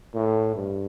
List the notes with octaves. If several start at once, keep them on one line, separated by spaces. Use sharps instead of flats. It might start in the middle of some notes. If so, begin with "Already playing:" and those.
A2
G2